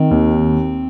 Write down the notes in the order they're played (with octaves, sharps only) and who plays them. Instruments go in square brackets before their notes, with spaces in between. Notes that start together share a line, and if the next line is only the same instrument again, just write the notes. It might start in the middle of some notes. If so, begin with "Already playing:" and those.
Already playing: [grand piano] D#3 [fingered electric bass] C4
[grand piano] D#2